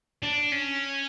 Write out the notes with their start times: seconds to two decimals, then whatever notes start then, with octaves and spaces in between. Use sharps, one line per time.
0.23 D4
0.52 C#4